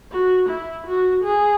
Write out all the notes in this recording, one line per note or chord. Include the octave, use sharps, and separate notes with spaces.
F#4
E4
F#4
G#4